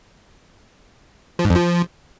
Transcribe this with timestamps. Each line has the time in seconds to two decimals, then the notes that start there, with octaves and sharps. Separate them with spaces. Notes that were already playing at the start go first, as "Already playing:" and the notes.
1.39 F3
1.45 G#2
1.50 F2
1.56 F3